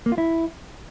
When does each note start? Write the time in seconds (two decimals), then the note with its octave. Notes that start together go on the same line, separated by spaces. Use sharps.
0.06 A#3
0.12 F4
0.18 E4